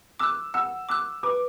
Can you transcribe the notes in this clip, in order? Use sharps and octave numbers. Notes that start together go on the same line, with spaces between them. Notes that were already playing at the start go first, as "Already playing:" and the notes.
D6 E6 F#6
F#5 E6
D6 E6 F#6
B4 D6